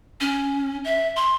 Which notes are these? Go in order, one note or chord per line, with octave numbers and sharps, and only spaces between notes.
C#4
E5
C6